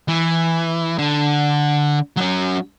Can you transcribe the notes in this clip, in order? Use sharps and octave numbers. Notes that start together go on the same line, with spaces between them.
E3
D3
F#3 C#4